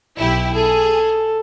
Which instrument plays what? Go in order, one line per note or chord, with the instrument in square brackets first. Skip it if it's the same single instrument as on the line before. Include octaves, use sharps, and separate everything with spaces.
[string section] B1 E4 G4
[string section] G#4 [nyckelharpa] A4